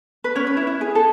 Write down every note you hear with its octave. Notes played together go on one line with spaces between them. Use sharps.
B4
C#4 C#5
B4
E4
E4
G#4
A4